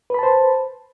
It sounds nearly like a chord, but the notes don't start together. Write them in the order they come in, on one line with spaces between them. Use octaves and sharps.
B4 B5 A5 C5